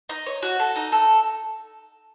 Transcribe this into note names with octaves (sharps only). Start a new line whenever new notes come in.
D#4
C#5
F#4
A4
D#4
A4